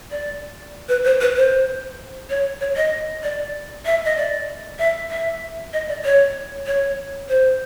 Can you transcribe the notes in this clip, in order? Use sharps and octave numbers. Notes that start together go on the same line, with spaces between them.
D5
B4
C5
B4
C5
C#5
C#5
D#5
D5
E5
D#5
D5
E5
E5
D#5
D5
C#5
C#5
C5